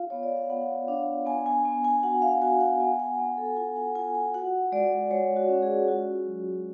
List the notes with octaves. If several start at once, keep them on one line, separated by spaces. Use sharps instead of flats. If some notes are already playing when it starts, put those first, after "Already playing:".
Already playing: F4 F5
B3 C#5
D5
F5
B3 F#5
D4 F5
B3 G#5
G#5
B3
G#5
F#4 F#5
F5
F#4 G#5
F#5
B3 G#5
F#5
B3 F#5
A4
F4 G#5
F#5
F4 G#5
G#5
F#4 F#5
G#3 D5
G#3 C#5
F#4
C#4
G#4
F4 F#4
F#3